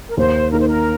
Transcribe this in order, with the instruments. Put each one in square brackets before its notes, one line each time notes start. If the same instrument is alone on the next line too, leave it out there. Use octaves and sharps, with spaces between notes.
[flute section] A#4
[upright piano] D#2 [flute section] C5
[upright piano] D#3 A#3 [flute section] A#4
[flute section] C5
A#4